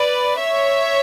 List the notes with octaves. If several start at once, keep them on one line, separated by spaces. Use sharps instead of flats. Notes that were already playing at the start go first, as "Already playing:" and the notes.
Already playing: B4 D5
C#5 E5